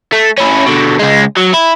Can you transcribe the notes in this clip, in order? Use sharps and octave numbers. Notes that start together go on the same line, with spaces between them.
A3
C#4 E4
B2 D3
C#2 G#3
F#3
E4